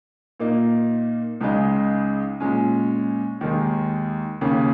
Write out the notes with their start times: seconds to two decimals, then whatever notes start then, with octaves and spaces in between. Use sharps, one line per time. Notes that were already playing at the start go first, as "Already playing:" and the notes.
0.40 A#2 A#3 D#4
1.41 C#2 C#3 G#3 D#4
2.40 A#2 G#3 C#4
3.41 D#2 D#3 G#3
4.41 D#2 C#3 A#3 C#4